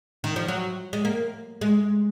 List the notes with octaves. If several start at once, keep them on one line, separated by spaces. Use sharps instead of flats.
D#3
F3
F#3
G#3
A#3
G#3